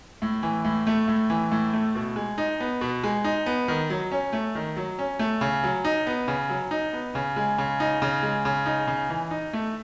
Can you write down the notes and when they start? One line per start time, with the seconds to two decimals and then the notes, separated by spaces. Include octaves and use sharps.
0.22 A2
0.43 E3
0.64 A2
0.87 A3
1.08 A2
1.30 E3
1.51 A2
1.73 A3
1.95 B2
2.16 G#3
2.38 D#4
2.60 B3
2.81 B2
3.04 G#3
3.24 D#4
3.46 B3
3.68 D#3
3.90 F#3
4.12 C#4
4.33 A3
4.55 D#3
4.77 F#3
4.99 C#4
5.19 A3
5.41 C#3
5.64 F#3
5.85 D#4
6.07 B3
6.28 C#3
6.49 F#3
6.71 D#4
6.93 B3
7.15 C#3
7.36 G#3
7.58 C#3
7.80 D#4
8.02 C#3
8.23 G#3
8.45 C#3
8.66 D#4
8.87 C#3
9.10 E3
9.31 D#4
9.53 A3